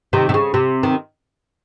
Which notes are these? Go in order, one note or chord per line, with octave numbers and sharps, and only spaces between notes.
C3 D#3
C3
C#3
C3
D#3